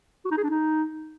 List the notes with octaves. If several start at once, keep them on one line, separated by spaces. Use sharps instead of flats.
F#4
D#4
G#4
D4
D#4